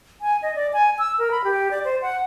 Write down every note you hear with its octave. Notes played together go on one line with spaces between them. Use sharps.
G#5
D#5
D5
G#5
E6
A#4
B5
G4
D5
C5
F#5